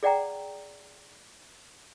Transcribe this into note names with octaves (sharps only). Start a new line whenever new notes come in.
G#4 D5 F#5 G5 A#5